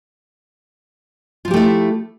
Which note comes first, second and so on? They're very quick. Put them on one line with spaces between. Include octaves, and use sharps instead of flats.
F4 F3 G4 A3 E4